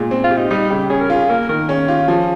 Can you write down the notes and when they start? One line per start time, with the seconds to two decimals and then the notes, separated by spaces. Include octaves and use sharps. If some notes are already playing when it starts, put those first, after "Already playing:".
Already playing: A#2 G#3
0.11 C4
0.24 F4
0.31 G4
0.37 D#4
0.50 G3 D#4
0.70 C#3 G4
0.90 C#4 G#4
1.01 A#4
1.10 F4 G#4
1.29 A#3 A#4
1.49 D#3 A#4
1.69 C#4 G#4
1.88 F4 G4
2.08 F3 G#4